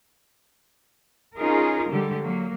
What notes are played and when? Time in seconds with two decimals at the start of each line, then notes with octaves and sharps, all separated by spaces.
1.37 C#4 D#4 F4 G#4 A#4
1.90 D3 G3 G#3 G4
2.21 F#3 A#3